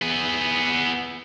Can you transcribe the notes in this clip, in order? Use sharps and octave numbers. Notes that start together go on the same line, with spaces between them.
B3 G#4